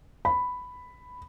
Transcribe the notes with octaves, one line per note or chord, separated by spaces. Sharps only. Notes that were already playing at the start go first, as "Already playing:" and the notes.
B5